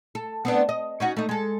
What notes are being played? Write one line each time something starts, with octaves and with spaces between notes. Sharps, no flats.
A4
B3 C4 D4
D#5
C#4 D#4 F#4
A3 D#4
G#3 A4